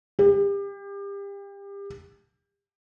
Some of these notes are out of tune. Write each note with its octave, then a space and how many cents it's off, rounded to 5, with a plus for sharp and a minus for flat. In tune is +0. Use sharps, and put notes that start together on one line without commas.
G4 +30